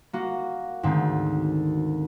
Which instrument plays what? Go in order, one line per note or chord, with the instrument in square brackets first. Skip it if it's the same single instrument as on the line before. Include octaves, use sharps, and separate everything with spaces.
[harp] A#3 F#4
D2 G#2 D#3 C4